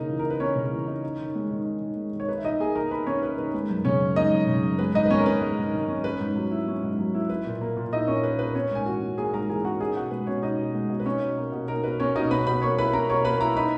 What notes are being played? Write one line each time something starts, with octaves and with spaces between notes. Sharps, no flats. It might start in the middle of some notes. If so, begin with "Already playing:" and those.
Already playing: C#3 A#3 D#4
E3
A#4
D#4
B4
A#3 C#4 C#5
C#3
E3
D#4
D#4
D#3
G#3
D#3
D#4
D#3
G#3
D#3
C#5
D#4 B4
E5
D#3 D#4 D#5
A#3 G#4 G#5
D#3 A#4 A#5
D#4 B4 B5
D#3 C#4 C#5
A#3 B4
D#3 B4
G#3 B4
F#2
C#3 C#4 C#5
F#2
G#3 D#4 D#5
F#2
C#3
F#2
G#3 B4
G#2 D#4 D#5
B4
D#3 C#4 C#5
A#4
C#4 B4
G#3
G#2
D#3
C#4
C#4 B4
G#2
F#3
E4
C#4
G#2
F#3
E4
E4 B4
A#2
A#3
A#2
D#4 E4 D#5
A#2 C#4 C#5
A#3 B4
A#2 B4
A#3 C#4 C#5
G#2 G#5
E3 F#4 F#5
C#4
A#3 G#4 G#5
G#2 A#4 A#5
E3 G#4 G#5
C#4 F#4 F#5
D#4 G#4 G#5
B2 F#4 F#5
G#3 B4
B2 C#4 C#5
D#4 D#5
B2
G#3
B2
B4
C#4 D#4 C#5
B2
A#3
B2
D#4 A#4
B2 B4
A#3 C#4 C#5
B2 D#4 D#5
C#4 B4 B5
B2 B4 B5
A#3 C#5 C#6
E4 B4 B5
C#4 A#4 A#5
B2 C#5 C#6
A#3 B4 B5
E4 A#4 A#5
D#4 B4 B5